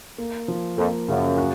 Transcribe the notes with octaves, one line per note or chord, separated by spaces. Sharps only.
A#3
F3
F2 A#3
F#2 C#3
F#4